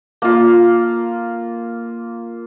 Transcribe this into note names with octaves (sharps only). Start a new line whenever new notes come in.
A#3 F4